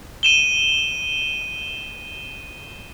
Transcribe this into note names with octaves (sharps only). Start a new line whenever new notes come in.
D#7 E7 G7